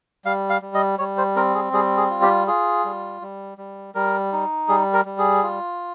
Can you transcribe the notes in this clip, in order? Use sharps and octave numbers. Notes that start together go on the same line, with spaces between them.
G3 F5
F5
G3
D#5
G3 C#5
C5
C4 A#4
G#4
G3 G#4
G#4
F4
G4
F4 G#4
G3
G3
G3
G3 A#4
D#4
G3 G#4
A#4
G3
G#4
F4